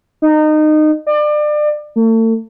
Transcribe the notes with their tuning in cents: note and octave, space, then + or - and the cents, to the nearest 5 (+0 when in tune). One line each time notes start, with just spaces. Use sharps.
D#4 -25
D5 +30
A3 +40